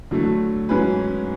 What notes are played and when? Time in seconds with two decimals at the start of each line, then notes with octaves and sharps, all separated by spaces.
0.11 D3 F#3 A3
0.69 G#2 F#3 C#4 G#4 B4